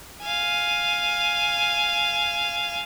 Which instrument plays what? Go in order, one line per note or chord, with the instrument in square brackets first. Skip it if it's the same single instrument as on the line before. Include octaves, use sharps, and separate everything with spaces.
[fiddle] F5 G#5